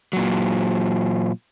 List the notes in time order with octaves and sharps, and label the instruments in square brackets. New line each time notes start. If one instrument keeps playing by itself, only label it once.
[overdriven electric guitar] A#2 F#3